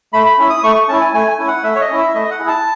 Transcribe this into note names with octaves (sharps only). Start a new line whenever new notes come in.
A3 B5
B5
C#4 E4
D#6
A3 C#6
C#6
C#4 E4 A5
G#5
A3 G#5
G#5
C#4 E4
F#5
A3 E5
C#5
D#5
C#4 E4
E5
A3 D#5
F#5
E4 G#4
A5